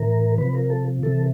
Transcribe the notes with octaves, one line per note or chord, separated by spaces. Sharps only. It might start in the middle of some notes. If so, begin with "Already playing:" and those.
Already playing: A2 E3 A#4
C3 F3 B4
A#4
A4
C3 E3 A4